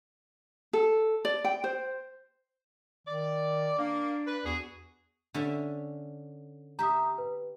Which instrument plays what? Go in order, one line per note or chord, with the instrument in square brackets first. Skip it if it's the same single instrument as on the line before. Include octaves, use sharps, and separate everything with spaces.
[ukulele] A4
D5
G5
C5
[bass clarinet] D#3 [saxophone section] D5
[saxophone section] A#3 [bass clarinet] D4
[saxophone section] B4
[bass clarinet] E2 [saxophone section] F#4 G#4
[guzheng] D3 C#4 E5
[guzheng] G4 E5 [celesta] A#5 D#6
[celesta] B4